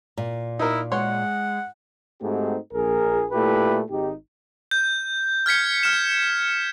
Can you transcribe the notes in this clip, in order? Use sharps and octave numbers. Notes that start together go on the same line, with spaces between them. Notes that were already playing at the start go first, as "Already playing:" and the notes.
A#2
D#4 E4 A#4
G#3 C#5 F#5 C6
G#2 A3 C4 D#4 F#4 G4
A#1 G#4 A#4
A#2 A3 E4 G4 A4 B4
G#1 D#4 G4
G6
F6 G#6 B6 C#7
F6 E7